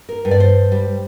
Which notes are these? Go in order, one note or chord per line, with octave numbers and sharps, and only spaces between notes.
A#4
G2
D5
C5
G3